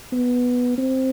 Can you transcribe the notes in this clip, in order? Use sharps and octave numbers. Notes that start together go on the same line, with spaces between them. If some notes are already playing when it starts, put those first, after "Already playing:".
B3
C4